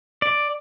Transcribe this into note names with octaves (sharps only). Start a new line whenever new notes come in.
D5